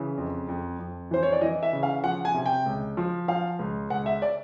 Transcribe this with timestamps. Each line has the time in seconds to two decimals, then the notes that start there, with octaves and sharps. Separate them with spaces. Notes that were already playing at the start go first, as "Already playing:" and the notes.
Already playing: C#3 E3
0.17 F2
0.49 F2
0.79 F2
1.11 E3 C5
1.23 C#5
1.32 D5
1.41 E3 D#5
1.63 E5
1.73 C#3
1.83 F5
2.04 F3 F#5
2.25 G#5
2.34 C3
2.46 G5
2.66 C#2
2.97 F3
3.28 F3 F5
3.59 C#2
3.90 C#2 F#5
4.06 E5
4.22 D5